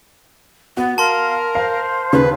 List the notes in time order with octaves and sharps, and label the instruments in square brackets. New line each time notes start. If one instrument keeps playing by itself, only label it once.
[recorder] B3 [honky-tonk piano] F#4
[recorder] A#4 [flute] F5 [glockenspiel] A5 C6
[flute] C5 [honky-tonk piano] F5
[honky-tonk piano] D#2 C#3 [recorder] B4